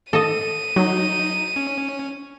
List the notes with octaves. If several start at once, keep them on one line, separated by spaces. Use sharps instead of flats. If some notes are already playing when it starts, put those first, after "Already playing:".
A4 D#5 D#7
F#3 D#4
C#4